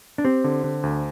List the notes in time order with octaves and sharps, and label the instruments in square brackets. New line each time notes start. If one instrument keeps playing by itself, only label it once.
[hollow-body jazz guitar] D4
[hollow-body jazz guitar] C4 [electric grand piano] G4
[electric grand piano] D3
D3
D2